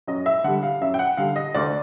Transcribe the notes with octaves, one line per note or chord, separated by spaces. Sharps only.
F#2 D#5
E5
D3 G3 F#5
F5
F#2 E5
G5
F#5
D3 G3 F5
D#5
D2 D5